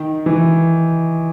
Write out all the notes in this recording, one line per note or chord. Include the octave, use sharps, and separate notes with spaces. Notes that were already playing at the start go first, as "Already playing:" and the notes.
Already playing: D#3
E3